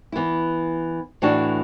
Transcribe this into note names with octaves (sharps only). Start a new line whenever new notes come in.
E3 B3 E4
A2 E3 A3 D4 F#4